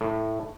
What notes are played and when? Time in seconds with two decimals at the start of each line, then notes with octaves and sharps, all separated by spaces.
0.01 A2